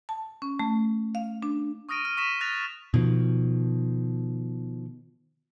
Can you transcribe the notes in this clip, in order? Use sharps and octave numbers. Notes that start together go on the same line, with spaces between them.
A5
C#4
A3
F5
D4
C#6 D#6 F6 A#6 D7 D#7
F6 D#7
C#6 D#6 A#6 B6 E7
F6 F#6 A6 A#6 D#7 F7
F6
B2 D#3 F3